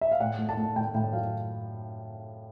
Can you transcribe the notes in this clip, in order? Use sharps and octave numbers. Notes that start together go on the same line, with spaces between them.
E5
F5
A2 F#5
A3
A5
A3
A2 G5
A2 G5
F#3 F5